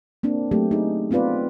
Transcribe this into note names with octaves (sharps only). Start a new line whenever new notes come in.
A#3 C4 D4
F#3 A3 C4 G4
D#4 G#4
B3 C4 F4 B4 D5